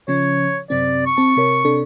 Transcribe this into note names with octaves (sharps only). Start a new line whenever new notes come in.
C#3 F3 C#4 C#5
F#2 C3 C4 D5
C#6
C4 A5
C3 A#4 C#5
C3 D4 A4